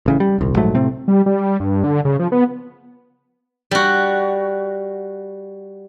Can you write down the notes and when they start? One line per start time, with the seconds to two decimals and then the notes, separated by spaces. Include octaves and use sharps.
0.06 A1 C#3 E3
0.20 G3
0.38 D#1 C2
0.56 A#1 G#2 F#3 A3
0.75 A2 C3 A3 C4
1.08 G3
1.26 G3
1.60 G2
1.84 D3
2.05 C#3
2.19 F3
2.32 B3
3.71 G3 F#4